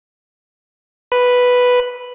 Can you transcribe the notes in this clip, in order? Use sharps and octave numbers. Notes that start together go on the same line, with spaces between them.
B4